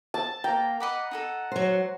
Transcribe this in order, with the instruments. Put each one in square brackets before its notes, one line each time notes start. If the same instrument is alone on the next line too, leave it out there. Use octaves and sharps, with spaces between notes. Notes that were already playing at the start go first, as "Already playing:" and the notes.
[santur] A5
[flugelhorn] A#3 [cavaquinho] G5 [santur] A#5
[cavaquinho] D#5 B5 D6 [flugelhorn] F#5
[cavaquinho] D#4 G#4 A4
[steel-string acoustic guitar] F#3 C5